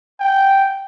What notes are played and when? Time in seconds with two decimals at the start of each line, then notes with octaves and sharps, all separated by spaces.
0.20 G5